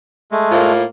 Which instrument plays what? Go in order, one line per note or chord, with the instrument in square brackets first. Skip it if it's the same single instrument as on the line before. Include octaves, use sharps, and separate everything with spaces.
[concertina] G#3 A3
[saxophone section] A2 A#3 F4